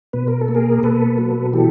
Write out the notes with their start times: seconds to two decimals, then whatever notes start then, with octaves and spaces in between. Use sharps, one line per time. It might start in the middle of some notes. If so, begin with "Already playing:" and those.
0.13 B2 B4
0.28 A#4
0.41 A4
0.48 A#3
0.55 G#4 A#4
0.83 B2 A4 B4
1.18 F#3
1.53 E3 G4 A4